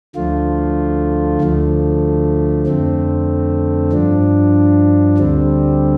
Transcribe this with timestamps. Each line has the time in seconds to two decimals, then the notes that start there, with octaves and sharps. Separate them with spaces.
0.16 D2 D3 F3 A3 F4
1.41 D2 D3 F3 A3
2.66 F2 D3 A3 C4
3.92 G2 F3 D4
5.18 D2 D3 G3 C4